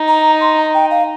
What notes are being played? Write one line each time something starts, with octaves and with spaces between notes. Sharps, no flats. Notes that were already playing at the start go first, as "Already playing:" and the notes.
Already playing: D#4
A#5
C6
A#5
G5
F5